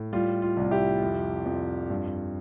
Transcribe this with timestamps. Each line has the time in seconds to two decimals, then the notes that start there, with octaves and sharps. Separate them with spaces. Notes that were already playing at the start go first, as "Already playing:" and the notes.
Already playing: A2
0.13 G3 F4
0.42 F4
0.57 C2
0.71 E4 G4
1.01 F2
1.45 F2
1.90 G2